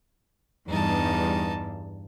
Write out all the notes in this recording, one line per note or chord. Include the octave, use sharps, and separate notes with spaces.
E2 G2 D#4 A5